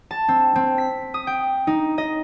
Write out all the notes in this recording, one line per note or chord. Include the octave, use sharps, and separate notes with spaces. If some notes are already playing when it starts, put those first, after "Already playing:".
A5
C4
C4
B6
D#6
G5
D#4
D#5